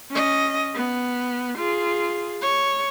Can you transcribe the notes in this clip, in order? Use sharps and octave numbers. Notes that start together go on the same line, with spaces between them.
C#4 D#5
B3
F4 G#4
C#5